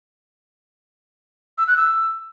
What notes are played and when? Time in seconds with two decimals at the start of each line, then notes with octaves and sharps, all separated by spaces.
1.58 E6
1.68 F#6
1.77 E6